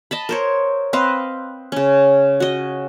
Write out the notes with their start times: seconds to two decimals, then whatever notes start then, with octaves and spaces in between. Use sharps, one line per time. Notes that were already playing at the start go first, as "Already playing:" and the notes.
0.11 D#5 A5 B5
0.29 A#4 C5 C#5
0.93 C4 B4 D#5 F5
1.72 C#3 C#4
2.40 F#4 D#5